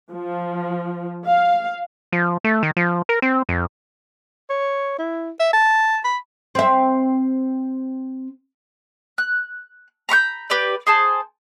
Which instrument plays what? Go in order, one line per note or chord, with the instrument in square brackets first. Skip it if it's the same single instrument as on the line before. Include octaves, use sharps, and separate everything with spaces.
[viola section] F3
F5
[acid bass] F3
A3
D#3
F3
A#4
C4
F2
[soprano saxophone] C#5
E4
E5
A5
B5
[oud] C4 E5
[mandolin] F#6
A#5 B5 C#6 G6
G4 B4 D5
G#4 C5 G#5 A5